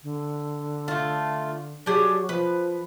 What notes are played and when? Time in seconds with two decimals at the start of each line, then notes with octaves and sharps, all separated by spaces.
0.03 D3
0.88 A3 F4
1.86 F#3 D4 G4 G#4
2.29 F3 B4